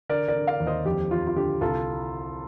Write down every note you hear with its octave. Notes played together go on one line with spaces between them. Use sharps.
D3 A#4 D5
A#4 D5
D3
D5 F5
D#2
C5 D#5
F2 G4
F2 F4
F4
D3 G4
C2 F4 A4